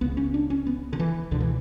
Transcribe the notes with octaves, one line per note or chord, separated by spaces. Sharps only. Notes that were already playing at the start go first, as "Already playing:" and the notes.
C#2 C#3 B3
C#4
D4
C#4
B3
D3
E3
C#2 B2 D3
E3